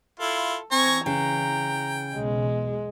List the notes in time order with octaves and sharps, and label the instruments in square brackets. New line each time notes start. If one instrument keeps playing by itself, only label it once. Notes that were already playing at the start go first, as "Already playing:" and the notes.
[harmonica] E4 F4 [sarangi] A4
[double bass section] E3 [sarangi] C4 [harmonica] G#5 A#5 C#6
[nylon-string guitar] C#3 [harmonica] G5 [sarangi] A#5
[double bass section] B1 E2 B2 [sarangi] G#3